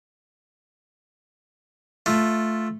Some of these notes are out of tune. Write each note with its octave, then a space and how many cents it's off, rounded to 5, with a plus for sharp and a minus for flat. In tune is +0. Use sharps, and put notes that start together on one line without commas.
A3 +0 F4 +0